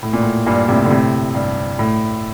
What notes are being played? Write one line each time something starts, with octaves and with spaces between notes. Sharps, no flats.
A2
A#2
A2
G2 A#2
A2 C3
D3
A2 C3
G2
A2